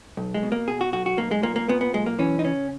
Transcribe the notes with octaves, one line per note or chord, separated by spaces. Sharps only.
B1
G#3
B2
A#3
B2 G#4
F#4
B1 F#4
F#4
B1 A#3
G#3
A#2 A#3
A#3
A#2 B3
B3
B1 G#3
A#3
E3 C#4
D#4
C#3 C#4